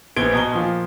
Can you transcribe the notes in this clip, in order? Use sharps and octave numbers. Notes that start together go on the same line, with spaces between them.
A#1 B3 G#6 D7 G7
B2 A#5 G7
A#2 F3